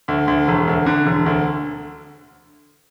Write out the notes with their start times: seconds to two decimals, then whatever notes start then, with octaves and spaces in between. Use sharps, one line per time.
0.08 D2
0.27 D2
0.48 E1
0.67 D2
0.86 D3
1.06 E1
1.26 D2